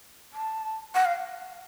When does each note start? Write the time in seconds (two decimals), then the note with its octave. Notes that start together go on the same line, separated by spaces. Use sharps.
0.33 A5
0.95 F#5
1.05 F5